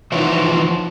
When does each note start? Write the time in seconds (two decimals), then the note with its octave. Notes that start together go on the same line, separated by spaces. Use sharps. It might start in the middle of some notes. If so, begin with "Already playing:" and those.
0.12 E3 F3 D#4 F#4 C5 C#5